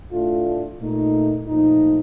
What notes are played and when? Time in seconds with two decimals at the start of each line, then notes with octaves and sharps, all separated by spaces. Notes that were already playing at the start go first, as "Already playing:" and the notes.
0.12 A2 A3 D4 F4
0.79 A#2 A3 D#4
1.46 A#2 F3 A3 D#4